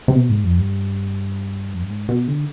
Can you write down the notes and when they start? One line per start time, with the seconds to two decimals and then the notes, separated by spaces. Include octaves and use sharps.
0.08 C3
0.15 B2
0.29 G#2
0.44 F2
0.58 G2
1.74 F2
1.82 G2
1.89 G#2
2.09 B2
2.28 D3